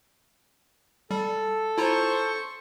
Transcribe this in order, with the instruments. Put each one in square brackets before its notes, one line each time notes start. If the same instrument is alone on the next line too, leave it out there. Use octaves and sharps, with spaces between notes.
[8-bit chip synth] G3 [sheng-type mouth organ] A4
[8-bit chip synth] E4 F4 A#5 [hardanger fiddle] C5 C#6